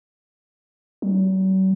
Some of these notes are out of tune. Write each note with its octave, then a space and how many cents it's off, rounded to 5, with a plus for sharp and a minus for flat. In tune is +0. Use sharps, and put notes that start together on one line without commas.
F#3 +45